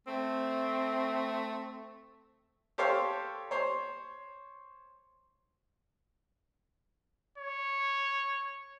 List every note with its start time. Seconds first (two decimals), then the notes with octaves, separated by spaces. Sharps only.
0.07 A3 C4
2.78 G4 A4 C5 C#5 F5
3.51 C5 C#5
7.38 C#5